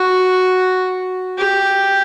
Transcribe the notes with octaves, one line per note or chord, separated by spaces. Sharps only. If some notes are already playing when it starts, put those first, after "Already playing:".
Already playing: F#4
G4